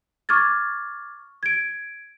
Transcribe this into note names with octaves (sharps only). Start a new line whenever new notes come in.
C#6 D6 F6 G#6 A6
G#6 D7